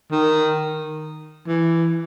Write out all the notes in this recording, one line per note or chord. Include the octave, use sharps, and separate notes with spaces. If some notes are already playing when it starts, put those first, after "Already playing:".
D#3
E3